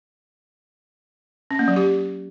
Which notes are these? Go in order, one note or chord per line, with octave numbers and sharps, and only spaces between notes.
C#4
A#3
F#3
G4